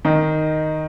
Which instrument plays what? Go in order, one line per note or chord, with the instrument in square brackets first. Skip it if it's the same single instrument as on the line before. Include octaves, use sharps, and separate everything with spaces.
[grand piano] D#3 D#4